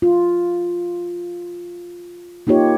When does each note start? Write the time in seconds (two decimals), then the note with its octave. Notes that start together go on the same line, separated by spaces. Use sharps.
0.02 F4
2.47 A#3 D#4 F4 G4 C#5